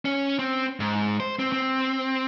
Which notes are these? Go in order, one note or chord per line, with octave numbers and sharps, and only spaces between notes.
C#4
C4
G#2
C5
C4
C4